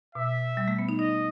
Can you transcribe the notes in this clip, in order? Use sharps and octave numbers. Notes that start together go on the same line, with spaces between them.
B2 E5
G3
A3
B3
D#4
D#4 D#5